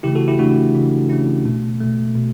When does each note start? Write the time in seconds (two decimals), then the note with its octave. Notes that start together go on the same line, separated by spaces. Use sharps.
0.03 C#3 E3 A3 E4 G4
0.15 F#4 A4
0.28 E4 G4
0.39 C#3 E3 A3 D4 F#4
0.74 C#3 E3 A3 D4
1.09 C#3 E3 A3 C#4 E4
1.45 B2 A3
1.81 B2 A3
2.15 B2